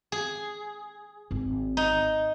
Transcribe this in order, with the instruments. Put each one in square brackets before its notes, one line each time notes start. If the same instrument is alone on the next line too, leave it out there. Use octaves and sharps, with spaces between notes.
[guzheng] G#4
[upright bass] G#1
[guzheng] D#4